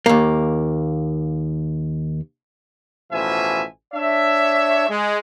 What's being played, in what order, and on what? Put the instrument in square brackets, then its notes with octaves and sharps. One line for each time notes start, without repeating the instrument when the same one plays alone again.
[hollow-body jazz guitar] D#2 A#3
[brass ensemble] A1 B2 F3 E5 G#5
D4 C#5 E5
G#3